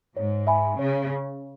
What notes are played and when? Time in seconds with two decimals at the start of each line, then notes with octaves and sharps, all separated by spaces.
0.16 G#2 C#5
0.47 E5 G#5 B5
0.79 C#3 C#5